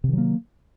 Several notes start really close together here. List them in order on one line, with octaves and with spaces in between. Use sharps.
C3 D#3 F#3 A#3